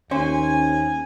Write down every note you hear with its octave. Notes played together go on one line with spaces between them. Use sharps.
D#2 C#4 C5 G#5